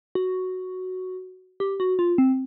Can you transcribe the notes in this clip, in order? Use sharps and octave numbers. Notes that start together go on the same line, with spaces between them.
F#4
G4
F#4
F4
C4